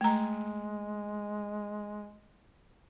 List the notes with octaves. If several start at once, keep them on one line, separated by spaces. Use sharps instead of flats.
G#3 A3 A#5